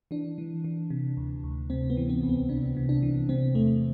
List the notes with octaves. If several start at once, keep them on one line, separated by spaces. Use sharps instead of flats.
E3 D4
E3
E3
C3
D2
D2
C3 C4
B3
E3
C4
C2
B3
C3 D4
C3
D4
E3
C3 C4
E2 A3